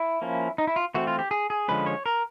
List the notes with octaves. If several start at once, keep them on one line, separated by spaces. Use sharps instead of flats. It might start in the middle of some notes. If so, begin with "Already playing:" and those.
Already playing: E4
F3 A#3 C#4
D#4
E4
F4
E3 A3 C4 F#4
F4
G4
G#4
G#4
D3 F3 G#3 C#4 B4
C#5
A#4